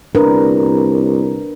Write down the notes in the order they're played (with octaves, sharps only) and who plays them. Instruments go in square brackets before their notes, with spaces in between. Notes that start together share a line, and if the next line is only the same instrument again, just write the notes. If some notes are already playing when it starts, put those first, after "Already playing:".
[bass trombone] C2 [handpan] D4 A#4 B4